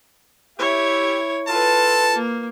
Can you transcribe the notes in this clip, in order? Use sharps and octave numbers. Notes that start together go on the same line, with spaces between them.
E4 G4 C#5 E5
F4 A4 B4 A5
A#3